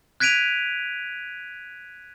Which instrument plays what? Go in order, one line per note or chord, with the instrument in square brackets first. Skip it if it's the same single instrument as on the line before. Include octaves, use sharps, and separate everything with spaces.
[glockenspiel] F#6 G#6 B6 D7 D#7 F7